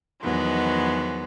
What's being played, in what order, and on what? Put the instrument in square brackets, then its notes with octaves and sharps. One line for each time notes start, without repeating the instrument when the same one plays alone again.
[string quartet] E2 D#3 F3 F#3 G#3 B3